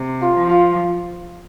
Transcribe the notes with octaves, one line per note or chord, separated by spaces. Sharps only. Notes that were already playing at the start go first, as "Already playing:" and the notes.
Already playing: C3
F4
F3
F4